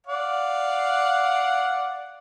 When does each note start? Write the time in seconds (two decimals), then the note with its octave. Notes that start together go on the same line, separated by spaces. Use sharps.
0.07 D5 F5 F#5